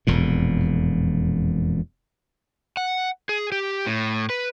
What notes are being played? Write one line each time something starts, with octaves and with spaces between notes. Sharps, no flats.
E1 F2 A#2
F#5
G#4
G4
A2
B4